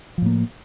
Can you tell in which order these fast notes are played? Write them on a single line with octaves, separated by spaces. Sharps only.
F3 A2 A#3